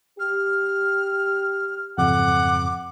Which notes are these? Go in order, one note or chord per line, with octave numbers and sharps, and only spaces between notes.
G4 F6
F2 G#2 C#3 F#5 D6